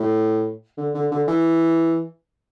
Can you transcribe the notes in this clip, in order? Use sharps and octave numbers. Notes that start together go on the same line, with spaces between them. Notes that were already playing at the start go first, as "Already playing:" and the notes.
Already playing: A2
D3
D3
D3
E3